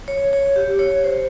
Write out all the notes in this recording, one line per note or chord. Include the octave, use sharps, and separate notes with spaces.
C#5
C#5
G4
C#5
C5